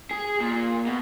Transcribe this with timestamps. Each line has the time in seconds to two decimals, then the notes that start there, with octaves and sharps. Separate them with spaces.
0.11 G#4
0.41 A#2
0.86 B2